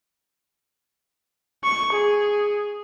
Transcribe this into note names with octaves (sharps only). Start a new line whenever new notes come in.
C#6
G#4